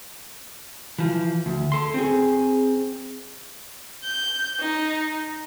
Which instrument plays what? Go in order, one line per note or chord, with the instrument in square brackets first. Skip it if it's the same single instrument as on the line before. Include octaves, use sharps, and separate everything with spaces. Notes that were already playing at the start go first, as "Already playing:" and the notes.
[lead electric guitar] E3 F3
D2
A4 C6
C4 G#4
[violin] G6
D#4